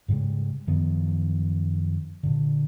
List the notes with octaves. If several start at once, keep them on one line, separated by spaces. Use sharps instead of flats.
G#2 C#3 G3 G#3
F#2 D#3 F3 B3
A#2 D3